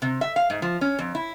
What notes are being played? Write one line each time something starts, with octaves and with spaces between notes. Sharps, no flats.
C3
E5
F5
G#2
F3
C#4
F2
E4